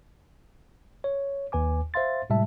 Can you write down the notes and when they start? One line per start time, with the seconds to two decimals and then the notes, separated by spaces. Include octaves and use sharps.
1.04 C#5
1.52 D#2 B4 G#5 D6
1.94 C5 E5 F5 C6 A6
2.30 A2 C3 G3 G#3 E5 A5